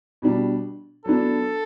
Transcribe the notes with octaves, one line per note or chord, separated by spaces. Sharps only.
B2 G3 D4
F#3 B3 D4 A4